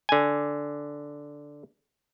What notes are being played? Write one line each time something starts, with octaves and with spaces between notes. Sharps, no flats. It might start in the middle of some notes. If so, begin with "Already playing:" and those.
D3 G#5